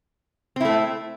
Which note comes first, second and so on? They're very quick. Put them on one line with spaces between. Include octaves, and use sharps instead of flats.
C4 E4 A3